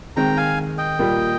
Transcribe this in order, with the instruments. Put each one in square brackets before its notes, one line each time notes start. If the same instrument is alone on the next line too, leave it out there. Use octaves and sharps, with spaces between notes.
[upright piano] D#3 G#3 C4 [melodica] G5 A#5
[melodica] F5 G#5
D#5 G5
[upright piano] A#2 G3 A#3